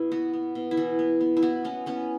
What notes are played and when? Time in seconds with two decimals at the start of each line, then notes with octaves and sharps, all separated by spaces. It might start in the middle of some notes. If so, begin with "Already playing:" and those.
Already playing: B2 E4
0.12 B3 F#4
0.34 B3
0.55 B2
0.71 E4
0.77 E3 F#4
0.99 B3
1.21 B3
1.37 E4
1.42 B3 F#4
1.65 B3 C#4
1.86 B3 C#4